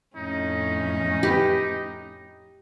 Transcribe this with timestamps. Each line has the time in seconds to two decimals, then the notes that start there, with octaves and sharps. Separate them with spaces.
0.16 F2 A2 C#4 D#4
1.23 G4 B4